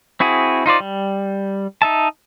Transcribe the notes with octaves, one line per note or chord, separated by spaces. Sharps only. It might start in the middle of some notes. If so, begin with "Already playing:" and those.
C4 E4 F#4 G#4
D#4 F4 C5 D5
G3
D#4 E5 A5